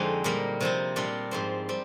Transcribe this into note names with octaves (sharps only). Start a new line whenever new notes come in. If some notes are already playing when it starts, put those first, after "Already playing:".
Already playing: F2 D3 G#3 C4 D#4
A#2 G3 A#3
C3 F3 C4
A#2 G3 D4 F4
G#2 F3 C4
G3 C4